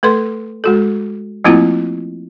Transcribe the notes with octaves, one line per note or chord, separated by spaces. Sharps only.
A3 A4 B4 C6
G#3 F#4 A4
F3 A3 A#3 C4 E4 F4